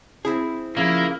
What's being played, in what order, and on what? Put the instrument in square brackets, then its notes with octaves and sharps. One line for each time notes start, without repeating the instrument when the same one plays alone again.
[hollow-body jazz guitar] C4 E4 G#4
[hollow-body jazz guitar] C#3 [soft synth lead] F3 [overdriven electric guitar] A#3 [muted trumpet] E4